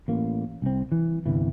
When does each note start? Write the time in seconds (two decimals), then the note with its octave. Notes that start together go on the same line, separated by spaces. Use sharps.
0.08 A1 A#3
0.62 C2 C4
0.92 E3
1.26 G1 C2 E3